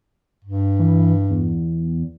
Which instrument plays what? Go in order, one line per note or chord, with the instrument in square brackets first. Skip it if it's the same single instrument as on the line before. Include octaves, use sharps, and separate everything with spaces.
[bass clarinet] G2
[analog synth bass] E3
E2